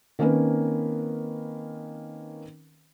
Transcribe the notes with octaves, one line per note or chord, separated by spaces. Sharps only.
D#3 A#3 C4 C#4 A#4 B4